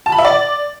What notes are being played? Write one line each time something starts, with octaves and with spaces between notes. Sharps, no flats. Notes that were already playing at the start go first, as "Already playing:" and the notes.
A5
B5
E5
D5